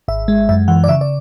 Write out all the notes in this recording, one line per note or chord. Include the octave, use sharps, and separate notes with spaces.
G#1 E5
G#3
F#2 E5
E3 F#5
D5
C#3 E5
D5